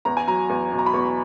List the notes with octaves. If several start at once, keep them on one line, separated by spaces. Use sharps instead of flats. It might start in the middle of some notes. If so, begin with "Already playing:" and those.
E2 A#5
G#5
F#3 A#5
E2
B2
A#5
B5
E2 C#6